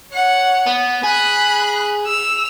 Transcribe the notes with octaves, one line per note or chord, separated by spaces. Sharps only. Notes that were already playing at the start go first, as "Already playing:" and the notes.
C#5 F#5
B3
G#4 B5 F#6
E6 F7